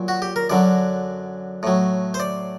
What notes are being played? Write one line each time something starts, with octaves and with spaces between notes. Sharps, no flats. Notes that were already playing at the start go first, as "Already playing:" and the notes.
Already playing: A#2 F#3
F#4
G4
A#4
F#2 D3 F#3 D5
A2 F#3
C5
D5